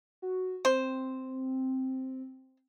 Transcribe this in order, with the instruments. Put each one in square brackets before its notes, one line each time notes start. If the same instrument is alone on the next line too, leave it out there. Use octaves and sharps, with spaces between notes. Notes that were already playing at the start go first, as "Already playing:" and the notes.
[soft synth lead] F#4
[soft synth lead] C4 [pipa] C5